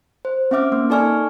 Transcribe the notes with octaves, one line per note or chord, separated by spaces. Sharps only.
C5
C4 C#4 E5 D6 F6
A#3 C4
D#4 A4 D5 G#5 C#6 F6